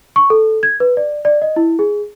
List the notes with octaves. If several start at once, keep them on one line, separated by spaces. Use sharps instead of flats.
C#6
A4
G#6
B4
D5
D5
D#5
E4
G#4